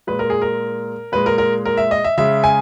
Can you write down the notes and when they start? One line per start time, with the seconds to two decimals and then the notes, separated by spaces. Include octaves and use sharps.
0.07 A#2 G#3 B4
0.19 A#4
0.30 G#4
0.42 A#4
1.12 A#2 G#3 B4
1.26 A#4
1.38 A#4
1.65 A#4
1.77 E5
1.91 D#5
2.04 E5
2.17 C#3 G#3 E5
2.44 G#5